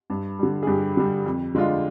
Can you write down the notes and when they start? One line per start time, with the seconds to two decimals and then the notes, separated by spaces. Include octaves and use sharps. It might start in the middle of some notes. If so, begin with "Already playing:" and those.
0.10 G2
0.39 D3 G3
0.63 G#4
0.67 G2 G4
0.97 D3 G3
1.26 F2
1.55 D3 G#3 D4 F4